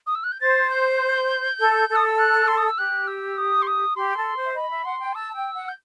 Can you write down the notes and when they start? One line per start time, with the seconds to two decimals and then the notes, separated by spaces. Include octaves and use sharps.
0.06 D#6
0.15 E6
0.23 F#6
0.32 G6
0.40 C5 A6
0.70 G6
1.59 A4
1.88 A4
1.95 D#6
2.07 E6
2.18 F#6
2.47 C6
2.57 D#6
2.68 E6
2.78 G4 F#6
3.07 E6
3.37 D#6
3.62 C6
3.67 D#6
3.96 G4 C6
4.16 A4
4.35 C5
4.45 E5
4.55 D#5 B5
4.70 E5
4.85 F#5 C6
5.00 G5
5.15 A5 E6
5.35 G5
5.55 F#5
5.68 G6